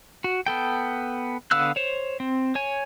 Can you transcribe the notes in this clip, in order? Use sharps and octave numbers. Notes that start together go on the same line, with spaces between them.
F#4
B3 A4 G5
D3 B3 F5 E6 F#6
C5 C#5
C4
C#5 G#5